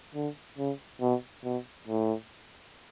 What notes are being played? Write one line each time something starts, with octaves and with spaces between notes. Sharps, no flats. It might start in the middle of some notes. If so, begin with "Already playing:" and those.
D3
C#3
B2
B2
A2